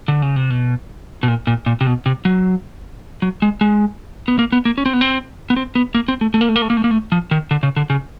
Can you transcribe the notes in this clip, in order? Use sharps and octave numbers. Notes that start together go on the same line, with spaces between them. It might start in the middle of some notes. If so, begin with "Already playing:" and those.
D3
C#3
C3
B2
B2
A#2
A#2
A#2
C3
B2
C3
F#3
F#3
G#3
G#3
B3
A#3
B3
A#3
C#4
C4
B3
C4
B3
C4
B3
A#3
C4
A3
A3
A#3
A3
A#3
A3
A#3
A3
A#3
A3
F3
D#3
D3
C#3
D3
C#3